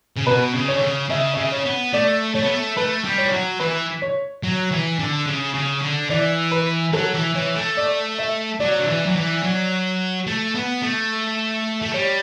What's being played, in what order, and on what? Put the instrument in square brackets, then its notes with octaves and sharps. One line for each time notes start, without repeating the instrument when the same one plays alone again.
[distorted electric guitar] C#3
[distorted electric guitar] B2 [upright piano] B4
[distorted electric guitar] C#3
[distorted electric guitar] D3 [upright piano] C#5
[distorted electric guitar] C#3
[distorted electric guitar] C#3 [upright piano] E5
[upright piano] E5
[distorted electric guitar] C#3
[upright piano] C#5
[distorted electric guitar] B3
[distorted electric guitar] A3 [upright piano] D5
[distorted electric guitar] A3 [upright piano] C#5
[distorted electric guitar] B3
A3
[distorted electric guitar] A3 [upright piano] B4
[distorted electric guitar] G3
[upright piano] C#5
[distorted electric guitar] E3
F#3
[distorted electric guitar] E3 [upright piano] B4
[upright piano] C#5
[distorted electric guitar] F#3
E3
D3
C#3
C#3
D3
[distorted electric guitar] E3 [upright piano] D5
[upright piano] B4
[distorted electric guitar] F#3 [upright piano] A4
[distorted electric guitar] E3
[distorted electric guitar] E3 [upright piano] C#5
[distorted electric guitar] A3
[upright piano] D5
E5
[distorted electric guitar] F#3 [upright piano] D5
[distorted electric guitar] D3
E3
F#3
E3
F#3
A3
B3
A3
A3
[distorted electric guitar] G3 [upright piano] C#5